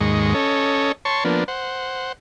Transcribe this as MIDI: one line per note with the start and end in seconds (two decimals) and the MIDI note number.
0.01 0.34 39
0.01 0.34 44
0.01 0.34 56
0.01 0.34 75
0.01 0.34 85
0.35 0.92 61
0.35 0.92 69
0.35 0.92 73
0.35 0.92 75
1.05 1.24 73
1.05 1.24 81
1.05 1.24 84
1.05 1.24 85
1.25 1.44 53
1.25 1.44 58
1.25 1.44 59
1.25 1.44 62
1.48 2.12 72
1.48 2.12 78